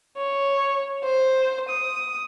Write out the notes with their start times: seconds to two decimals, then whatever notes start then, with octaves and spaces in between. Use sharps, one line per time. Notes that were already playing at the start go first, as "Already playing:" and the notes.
0.18 C#5
1.04 C5
1.69 D#6